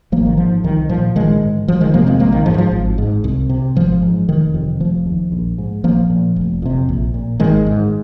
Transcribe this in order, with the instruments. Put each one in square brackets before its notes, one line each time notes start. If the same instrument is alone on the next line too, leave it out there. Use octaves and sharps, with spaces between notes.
[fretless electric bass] G#1 F3 A#3
D#3
G#2 F3
C2 D#3
A#2 F3
A#1 D#3 G#3
G#2
F1 F3
D#3 G#3
F2 C3 F3 A#3
G#3 C4
A#1 F3 A#3
D#3
G#2 F3
D#3
F3
G#1
G#2
C2
C3
G#1 F3
G#2
F1 D#3
F2 C3
F1 F3
D#2
A#1
G#2
A#1 F3 A#3
A#2
F1
F2 C3
A#1
A#2
G#1 D#3 G#3
G#2